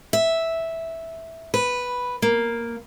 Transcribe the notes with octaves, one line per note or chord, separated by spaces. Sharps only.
E5
B4
A#3